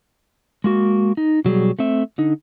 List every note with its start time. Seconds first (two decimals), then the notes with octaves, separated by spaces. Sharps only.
0.64 G#3 A#3 F#4
1.17 D#4
1.45 B2 F#3 G3 G#4
1.79 A3 C4 E5
2.18 D3 D#4